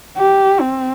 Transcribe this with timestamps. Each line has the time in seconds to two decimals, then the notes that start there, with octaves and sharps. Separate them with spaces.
0.18 G4
0.61 C4